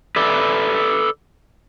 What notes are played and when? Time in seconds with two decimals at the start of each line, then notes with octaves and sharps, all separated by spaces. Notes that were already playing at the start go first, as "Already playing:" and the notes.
0.16 A4 B4 D5 E5